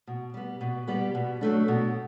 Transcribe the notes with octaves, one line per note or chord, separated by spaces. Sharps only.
B2
G3 B3
B2
G3 B3
B2
F#3 A3 D4
B2